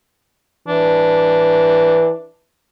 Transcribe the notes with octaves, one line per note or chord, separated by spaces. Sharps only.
E3 D4